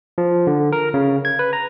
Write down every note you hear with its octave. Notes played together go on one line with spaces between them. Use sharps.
F3
D3
A#4
C#3
G#6
B4
A#5